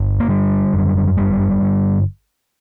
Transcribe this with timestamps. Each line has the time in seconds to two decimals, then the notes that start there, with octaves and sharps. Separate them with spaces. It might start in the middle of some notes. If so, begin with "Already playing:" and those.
Already playing: G1
0.20 A#3
0.28 D3 G3
0.73 F#2
1.17 G1 G3
1.61 G1